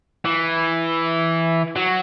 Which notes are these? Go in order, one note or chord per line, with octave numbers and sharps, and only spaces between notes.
E3
F#3